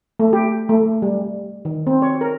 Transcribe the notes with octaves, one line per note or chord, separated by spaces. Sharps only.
A3
G4
A3
G3
D#3
C4
C#5
A#4